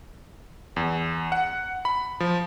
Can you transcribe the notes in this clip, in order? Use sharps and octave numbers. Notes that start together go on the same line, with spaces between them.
E2
F#5
B5
F3